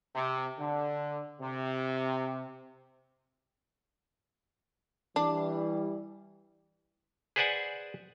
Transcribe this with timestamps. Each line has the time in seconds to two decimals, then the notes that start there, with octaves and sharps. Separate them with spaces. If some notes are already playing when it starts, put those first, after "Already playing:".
0.15 C3
0.58 D3
1.41 C3
5.16 E3 G3 D4
7.36 G#4 B4 C5 D5 F#5 G#5